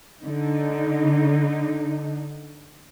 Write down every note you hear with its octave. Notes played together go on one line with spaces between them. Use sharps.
D3 D#4